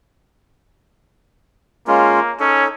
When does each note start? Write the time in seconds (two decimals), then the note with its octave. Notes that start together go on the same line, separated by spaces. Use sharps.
1.87 G#3 A#3 C#4 F4
2.40 C#4 D#4 A4 C#5